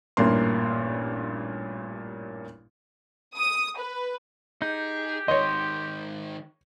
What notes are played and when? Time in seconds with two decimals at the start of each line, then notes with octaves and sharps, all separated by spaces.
0.17 A1 G2 A#2 A#3 C6
3.36 D#6
3.78 B4
4.62 D#4 G4 G#4
5.28 G#2 D#3 C#5 D#5 C6